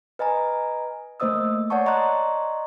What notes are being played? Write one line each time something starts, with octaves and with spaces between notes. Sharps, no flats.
B4 D#5 G#5 A#5
A3 A#3 C5 D#5 D#6 E6
C#5 D5 F#5 A5 C#6
D5 D#5 A#5 C6 C#6 F#6